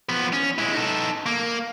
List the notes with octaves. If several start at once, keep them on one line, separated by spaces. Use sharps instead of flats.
F3 B3
C#4
G#3 E4
D#4 A4
A#3